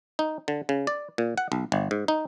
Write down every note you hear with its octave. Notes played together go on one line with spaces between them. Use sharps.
D#4
D3
C#3
D5
A#2
F#5
B1
G1
G#2
D#4